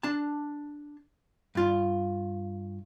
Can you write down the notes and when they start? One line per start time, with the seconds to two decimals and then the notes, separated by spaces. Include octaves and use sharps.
0.03 D4 A5
1.55 G2 F4